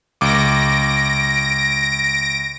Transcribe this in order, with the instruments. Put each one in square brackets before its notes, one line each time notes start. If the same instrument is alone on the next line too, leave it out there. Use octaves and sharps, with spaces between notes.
[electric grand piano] C#2 D6 [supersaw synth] A#6 D7